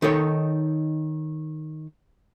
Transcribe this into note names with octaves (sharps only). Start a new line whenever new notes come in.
D#3 D#4 A4 C#5